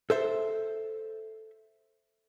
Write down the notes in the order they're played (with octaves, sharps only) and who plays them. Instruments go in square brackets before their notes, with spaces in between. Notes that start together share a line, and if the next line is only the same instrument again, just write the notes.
[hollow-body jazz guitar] A4 C5 E5